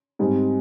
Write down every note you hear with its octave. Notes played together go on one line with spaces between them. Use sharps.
G#2 G3 C4